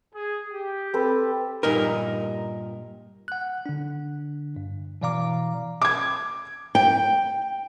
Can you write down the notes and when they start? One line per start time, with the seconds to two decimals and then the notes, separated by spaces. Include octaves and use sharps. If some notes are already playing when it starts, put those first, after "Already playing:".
0.14 G#4
0.52 G4
0.93 C4 A4 B4
1.63 G2 A#2 D#4 A#4
3.28 F#5 F#6
3.66 D3 D4
4.56 G2
5.02 B2 E3 D5 F5 A#5 D6
5.82 D6 G#6
6.75 G5